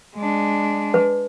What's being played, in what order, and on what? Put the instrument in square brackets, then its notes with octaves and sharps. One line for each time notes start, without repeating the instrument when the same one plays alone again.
[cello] G#3 D4
[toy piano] B4